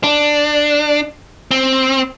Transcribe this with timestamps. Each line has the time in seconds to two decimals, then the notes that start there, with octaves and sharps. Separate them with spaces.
0.04 D4
1.51 C4